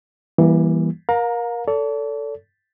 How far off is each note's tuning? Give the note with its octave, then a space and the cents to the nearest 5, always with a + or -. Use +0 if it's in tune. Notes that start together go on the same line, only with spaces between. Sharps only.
E3 +0 G3 +0 A#3 +35
A#4 +25 F5 +35 A#5 +0
A4 +10 D5 -45